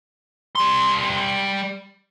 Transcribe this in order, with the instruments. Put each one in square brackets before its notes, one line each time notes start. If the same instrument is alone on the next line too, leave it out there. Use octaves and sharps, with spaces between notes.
[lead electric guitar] G3 C6